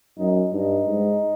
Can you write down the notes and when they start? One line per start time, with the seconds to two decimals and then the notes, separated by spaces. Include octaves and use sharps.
0.18 F#2 D#4
0.52 G2 D#4
0.86 G#2